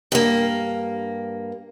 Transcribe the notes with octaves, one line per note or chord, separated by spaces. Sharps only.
G2 A#3